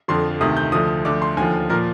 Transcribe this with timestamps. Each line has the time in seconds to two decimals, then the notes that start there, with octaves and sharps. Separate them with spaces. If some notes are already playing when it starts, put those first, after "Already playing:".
0.08 F2 D3 F3 C6
0.41 D2 C3 D#3 D#6
0.57 G6
0.72 D2 D3 F3 D#6
1.05 D2 D3 F3 D6
1.22 C6
1.37 D#2 D3 F3 G#5
1.69 A#2 F3 A#4